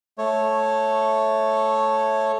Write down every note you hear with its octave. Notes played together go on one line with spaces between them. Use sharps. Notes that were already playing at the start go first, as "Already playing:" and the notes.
A3 C#5